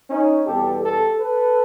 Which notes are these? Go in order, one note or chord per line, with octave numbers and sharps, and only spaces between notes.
C#4 D#4
E2 B2 G3 B3 G4 A4
G4 A4
A4 B4